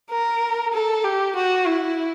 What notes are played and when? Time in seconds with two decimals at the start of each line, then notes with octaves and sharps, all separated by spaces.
0.10 A#4
0.73 A4
1.04 G4
1.36 F#4
1.66 E4